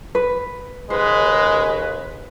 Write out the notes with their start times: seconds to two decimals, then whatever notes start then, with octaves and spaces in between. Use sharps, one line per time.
0.15 B4
0.90 D#2 C#3 G#3 B4 C5